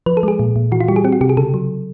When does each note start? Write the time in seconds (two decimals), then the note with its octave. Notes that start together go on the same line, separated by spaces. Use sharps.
0.06 F3 B4
0.17 A4
0.23 G#3 G#4
0.39 A#2
0.56 A#2
0.72 E3 F#4
0.81 F4
0.88 G3 G4
0.96 G#4
1.04 C4 G4
1.12 F#4
1.21 C3 G4
1.29 G#4
1.37 C#3 A4
1.54 F#3